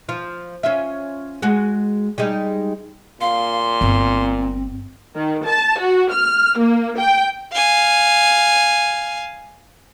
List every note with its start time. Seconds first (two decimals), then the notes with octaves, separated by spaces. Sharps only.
0.09 F3 F4
0.63 C#4 F4 E5
1.42 G#3 F#4
2.18 G3 G#3 D#4
3.21 A#2 F5 C6
3.81 G1 C4
5.16 D#3
5.47 A5
5.80 F#4
6.12 F6
6.60 A#3
6.99 G5
7.53 F5 G#5